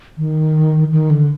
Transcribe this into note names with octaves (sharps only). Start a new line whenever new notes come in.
D#3
D#3
D3